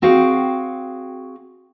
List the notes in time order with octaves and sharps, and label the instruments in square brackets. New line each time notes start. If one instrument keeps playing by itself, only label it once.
[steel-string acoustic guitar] C4 F#4 G#4 F5 G5